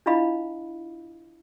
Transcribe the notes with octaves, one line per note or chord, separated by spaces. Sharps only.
D4 E4 F4 D#5 F5 B5